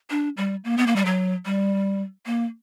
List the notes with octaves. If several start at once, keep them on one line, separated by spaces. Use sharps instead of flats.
D4
G3
A#3
B3
A#3
G3
F#3
G3
A#3